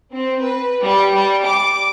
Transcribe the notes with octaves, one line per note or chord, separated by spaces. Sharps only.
C4
B4
G3
G3
D6